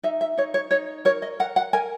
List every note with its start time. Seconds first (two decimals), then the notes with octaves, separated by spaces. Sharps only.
0.03 D#4 E5
0.21 E5
0.37 D#4 C#5
0.54 C#5
0.71 D#4 C#5
1.05 A#4 C#5
1.22 D#5
1.40 A#4 F#5
1.56 F#5
1.73 A#4 G#5